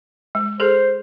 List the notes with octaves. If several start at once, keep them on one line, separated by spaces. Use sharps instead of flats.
G#3
G#4 A4 C5